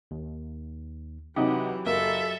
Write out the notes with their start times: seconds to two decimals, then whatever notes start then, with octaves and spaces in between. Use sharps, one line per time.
0.11 D#2
1.36 C3 E3 F#3 D#4 G4 F#5
1.86 F#1 A#3 A4 E5